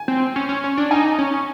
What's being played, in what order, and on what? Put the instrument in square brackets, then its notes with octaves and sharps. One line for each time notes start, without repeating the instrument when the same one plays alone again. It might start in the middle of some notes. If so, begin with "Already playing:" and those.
Already playing: [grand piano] G#5
[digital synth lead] C4
C#4
C#4
C#4
D4
[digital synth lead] D#4 [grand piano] G#5
[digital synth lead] C#4